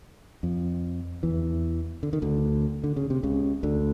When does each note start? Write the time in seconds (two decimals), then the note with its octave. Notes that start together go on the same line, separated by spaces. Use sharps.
0.43 F2 F3
1.23 E2 E3
2.03 D3
2.13 D#3
2.22 D2 D3
2.84 D3
2.96 C#3
3.10 C3
3.23 C#2 C#3
3.63 D2 D3